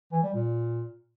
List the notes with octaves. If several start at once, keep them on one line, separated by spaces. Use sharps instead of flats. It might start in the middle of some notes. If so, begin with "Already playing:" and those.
E3
G3
A#2